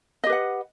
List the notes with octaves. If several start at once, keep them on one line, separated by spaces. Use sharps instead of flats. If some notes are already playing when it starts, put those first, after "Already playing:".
G4 B4 D#5 F#5